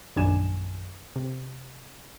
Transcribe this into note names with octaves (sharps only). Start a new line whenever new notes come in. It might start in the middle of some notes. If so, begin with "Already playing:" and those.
A#1 F#2 D#3 D4 G#5 E7
C3